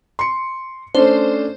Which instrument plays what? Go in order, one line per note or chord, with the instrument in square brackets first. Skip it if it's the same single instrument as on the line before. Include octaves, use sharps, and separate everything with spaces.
[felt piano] C6 C#7
[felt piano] A3 C#4 D4 [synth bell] C5